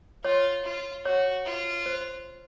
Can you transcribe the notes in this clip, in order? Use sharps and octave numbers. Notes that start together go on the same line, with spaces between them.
F4 C#5
F4
F#4 C#5
F4
C5